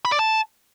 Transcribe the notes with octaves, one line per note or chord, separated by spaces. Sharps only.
B5
D5
A5